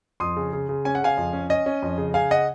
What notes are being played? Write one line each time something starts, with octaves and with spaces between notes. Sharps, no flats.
F2 C6 D#6
C#3
C#3
C#3
C#4 G#5
F#5
C#3 F5 G#5
F2
C#4
C#4 D#5
C#4
F2
C#3
C#3 F5 G#5
D#5 F#5